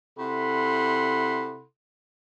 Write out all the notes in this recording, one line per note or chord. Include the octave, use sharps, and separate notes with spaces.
C3 E4 A4 F#5 B5 C6